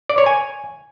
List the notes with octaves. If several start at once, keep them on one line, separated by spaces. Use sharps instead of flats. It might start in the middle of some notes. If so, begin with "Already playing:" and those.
D5
C#5
G#5